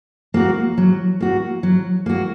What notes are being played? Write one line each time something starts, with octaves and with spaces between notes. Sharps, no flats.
A#3 F#4
F#3
A#3 F#4
F#3
A#3 F#4